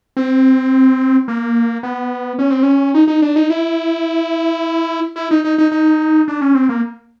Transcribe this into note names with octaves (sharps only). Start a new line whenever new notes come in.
C4
A#3
B3
C#4
C4
C#4
D#4
D#4
D4
D#4
E4
E4
D#4
D#4
D#4
D#4
D4
C#4
C4
A#3